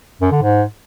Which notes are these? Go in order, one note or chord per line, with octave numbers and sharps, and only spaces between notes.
F#2
D3
G#2